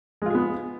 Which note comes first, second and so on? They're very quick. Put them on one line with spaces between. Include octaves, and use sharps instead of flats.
G#3 F4 G#4 B3